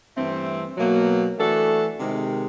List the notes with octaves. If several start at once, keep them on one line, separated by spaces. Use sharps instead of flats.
G2 E3 A3 C4
B2 F#3 A#3
E3 A3 D4 F#4 A4
C3 D#3 G#3